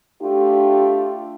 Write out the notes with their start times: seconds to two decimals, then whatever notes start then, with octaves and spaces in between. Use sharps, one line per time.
0.22 A3 D4 F4 G4